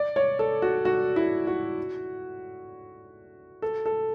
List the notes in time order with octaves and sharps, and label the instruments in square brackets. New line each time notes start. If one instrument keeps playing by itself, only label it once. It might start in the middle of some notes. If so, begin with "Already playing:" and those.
Already playing: [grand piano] D5
C#5
A4
F#4
F#4
E4
F#4
A4
A4